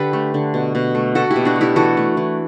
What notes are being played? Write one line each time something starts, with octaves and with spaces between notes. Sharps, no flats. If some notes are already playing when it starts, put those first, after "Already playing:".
Already playing: D3 G4 A4 B4
A3
D3
B2
B2
A3
A3 F#4 A4
E4 G4
B2
D4 F#4
A3
E4 G4
E3 F#4 A4
A3
E3